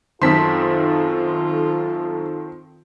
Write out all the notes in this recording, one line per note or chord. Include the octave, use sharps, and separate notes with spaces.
F#2 D#3 C4 F4 A4 A5 C6 B6